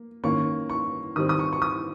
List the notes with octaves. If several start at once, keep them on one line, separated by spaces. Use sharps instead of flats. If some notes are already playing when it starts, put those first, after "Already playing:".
Already playing: A#3
D#3 A#3 C#4 C#6
C#6
D#3 G3 C4 D#6
D#6
C#6
C#6
D#6